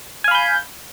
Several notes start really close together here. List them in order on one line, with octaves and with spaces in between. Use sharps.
G#5 F5 B5 G6